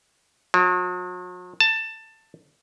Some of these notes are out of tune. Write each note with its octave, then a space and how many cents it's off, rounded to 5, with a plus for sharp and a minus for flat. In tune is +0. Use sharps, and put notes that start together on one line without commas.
F#3 -45
A5 +15